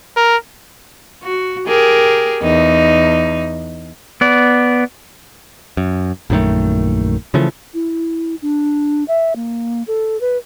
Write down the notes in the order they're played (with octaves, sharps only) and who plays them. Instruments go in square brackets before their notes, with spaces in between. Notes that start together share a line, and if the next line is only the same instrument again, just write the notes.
[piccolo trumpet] A#4
[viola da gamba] F#4
G4 G#4 A#4
E2 D#4
[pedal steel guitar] B3 D5
[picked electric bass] F#2
A#1 F#2 D#3 A3
C#3 E3 F3 A3
[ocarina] E4
D4
E5
A#3
A4
B4